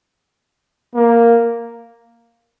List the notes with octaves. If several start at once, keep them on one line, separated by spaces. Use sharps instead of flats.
A#3